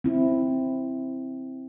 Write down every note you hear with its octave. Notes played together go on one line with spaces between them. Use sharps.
C4 E4